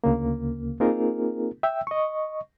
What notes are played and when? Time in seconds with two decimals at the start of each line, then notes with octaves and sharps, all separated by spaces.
0.04 D2 C#3 A#3
0.80 A#3 C4 D#4 F4 G#4 A#4
1.63 E5 G5 E6
1.87 D#5 C#6